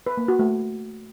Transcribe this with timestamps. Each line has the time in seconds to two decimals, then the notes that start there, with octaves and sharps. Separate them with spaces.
0.06 B4
0.17 A#3
0.28 F#4
0.39 A3